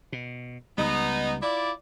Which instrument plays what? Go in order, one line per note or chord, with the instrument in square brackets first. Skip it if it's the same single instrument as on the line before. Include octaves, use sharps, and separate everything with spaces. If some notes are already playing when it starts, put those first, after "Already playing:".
[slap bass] B2
[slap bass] C#2 G3 [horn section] B3 D#4
[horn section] E4 F4 D5